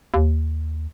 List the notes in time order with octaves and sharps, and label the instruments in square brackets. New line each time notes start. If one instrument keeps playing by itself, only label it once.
[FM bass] D#2